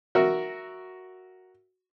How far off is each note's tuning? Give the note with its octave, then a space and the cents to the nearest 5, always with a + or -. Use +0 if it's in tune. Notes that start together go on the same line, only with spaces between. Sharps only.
F#4 +0 A#4 +0 E5 +0